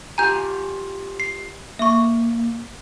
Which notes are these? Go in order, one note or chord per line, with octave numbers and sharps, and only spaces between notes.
F4 G4 G#5 A#5 G6
C7
A#3 E5 C#6